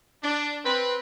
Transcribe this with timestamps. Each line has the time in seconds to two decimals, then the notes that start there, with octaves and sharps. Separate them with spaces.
0.23 D4
0.64 C4 B4